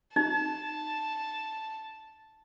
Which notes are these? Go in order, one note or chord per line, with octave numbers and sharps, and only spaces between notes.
D#4 A5